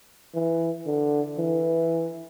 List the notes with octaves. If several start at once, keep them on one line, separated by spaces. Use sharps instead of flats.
E3
D3
E3